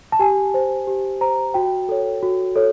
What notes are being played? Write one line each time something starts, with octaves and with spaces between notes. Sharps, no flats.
A5
G4 G#5
C5
G4
C5 A#5
F#4 G5
A4 C#5
F#4
A4 C#5